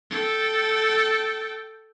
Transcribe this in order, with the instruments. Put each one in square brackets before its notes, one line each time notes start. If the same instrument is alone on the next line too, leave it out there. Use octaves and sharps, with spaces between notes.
[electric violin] A4 G5